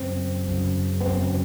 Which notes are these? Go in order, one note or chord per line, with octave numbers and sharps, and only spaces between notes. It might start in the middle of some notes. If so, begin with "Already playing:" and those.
Already playing: F#2 C#3 C4
F#2 C#3
B3
F#2 C#3 C4